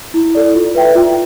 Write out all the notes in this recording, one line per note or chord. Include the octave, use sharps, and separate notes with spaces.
E4
A4 D5
F4
B4 E5 G5
F4